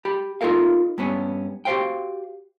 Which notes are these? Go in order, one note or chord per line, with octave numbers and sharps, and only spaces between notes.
G4 B5
D#4 F4 F#4 A4 A#4 F5
G2 B3 C#4
F#4 G4 B4 C5 F5 G5